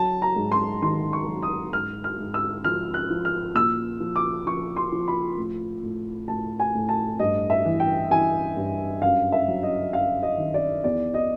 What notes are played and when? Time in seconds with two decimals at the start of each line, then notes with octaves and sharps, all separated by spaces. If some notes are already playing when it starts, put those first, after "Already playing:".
Already playing: F#3 A5
0.22 A#5
0.36 G#2
0.52 C6
0.82 D#3 C6
1.13 C#6
1.28 F#3
1.42 D#6
1.73 G#2 F6
2.04 F6
2.18 G#2
2.34 E6
2.64 F3 F6
2.94 F#6
3.10 F3
3.25 F6
3.55 A#2 E6
4.00 F3
4.16 D6
4.47 F3 C#6
4.77 C6
4.92 F3
5.08 B5
5.37 A2
5.83 A2
6.28 A2 A5
6.60 G#5
6.75 A2
6.89 A5
7.19 G2 D#5
7.50 E5
7.65 E3
7.80 G5
8.10 E3 G#5
8.57 G2
9.02 F#2 F5
9.32 E5
9.48 F#3
9.63 D#5
9.92 F#2 F5
10.23 D#5
10.38 D#3
10.54 D5
10.84 E2 D5
11.14 D#5